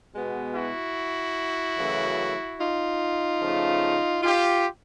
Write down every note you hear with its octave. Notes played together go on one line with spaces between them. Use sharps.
B2 G#3 B3
E4 F#4
F#2 C#3 E3 A3
D#4 F4
C#3 F3 A3
F4 G4